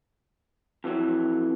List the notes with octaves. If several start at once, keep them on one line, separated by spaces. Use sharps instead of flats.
F2 E3 F#3